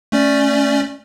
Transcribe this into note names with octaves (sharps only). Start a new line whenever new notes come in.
A3 C#4 D5